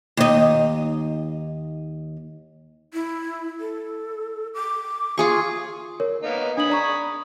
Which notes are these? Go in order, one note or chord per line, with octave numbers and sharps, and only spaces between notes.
D#2 D#4
E4
A4
D6
F4 G#4 C#6
A#4 C#5
A#3 B3 D#4
D4 G#5 B5 D#6 F#7
D5 A#5 C#6